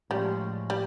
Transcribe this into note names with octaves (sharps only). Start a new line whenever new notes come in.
A2 F3 G3 G#3 C#4
G3